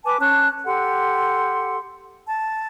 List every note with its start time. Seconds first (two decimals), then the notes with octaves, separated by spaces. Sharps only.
0.04 B4 G#5 A5 D6
0.20 C#4 A5 F#6
0.65 G4 A4 F#5 C6
2.26 A5